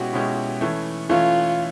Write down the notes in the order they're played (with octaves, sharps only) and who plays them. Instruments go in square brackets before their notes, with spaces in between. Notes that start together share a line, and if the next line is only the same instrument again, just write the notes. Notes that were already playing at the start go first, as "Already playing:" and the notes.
Already playing: [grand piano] B2 G#3 C#4 E4 G4 [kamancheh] F#4
[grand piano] B2 G#3 C#4 E4 G4
E3 A3 C#4
[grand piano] E3 A3 C#4 [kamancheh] F4